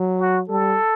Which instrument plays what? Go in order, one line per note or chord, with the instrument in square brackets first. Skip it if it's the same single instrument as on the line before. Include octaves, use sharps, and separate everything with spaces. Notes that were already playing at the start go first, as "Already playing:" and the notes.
Already playing: [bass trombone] F#3
[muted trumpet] F#4
[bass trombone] G3 [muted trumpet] A4